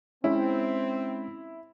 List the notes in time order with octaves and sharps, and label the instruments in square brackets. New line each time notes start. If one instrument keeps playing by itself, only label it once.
[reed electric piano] G#3 C#4 [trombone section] C4 [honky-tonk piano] E4